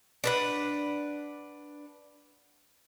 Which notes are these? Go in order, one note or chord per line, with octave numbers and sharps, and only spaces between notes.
D4 B4 F#5